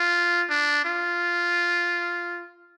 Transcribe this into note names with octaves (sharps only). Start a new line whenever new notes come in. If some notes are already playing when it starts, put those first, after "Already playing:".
Already playing: F4
D4
F4